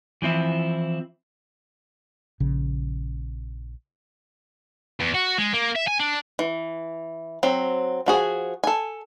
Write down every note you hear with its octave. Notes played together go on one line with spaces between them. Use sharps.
E3 F3 C4 E4
A#1 C#3
E2
F#4
G#3
A#3
E5
G#5
D4
E3
F#3 C4
F3 F#4 G#4
A4 G#5